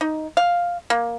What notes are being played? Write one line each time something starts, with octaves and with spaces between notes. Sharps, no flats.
D#4
F5
A#3